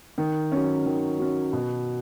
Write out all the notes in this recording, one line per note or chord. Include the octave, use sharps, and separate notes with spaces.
D#3
F#3 C#4
D#3
F#3 C#4
B2